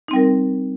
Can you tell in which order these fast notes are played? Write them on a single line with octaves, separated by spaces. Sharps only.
D#4 C4 G3 A#4